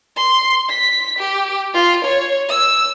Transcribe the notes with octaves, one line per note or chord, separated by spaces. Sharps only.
C6
B6
G4
F4
C#5
E6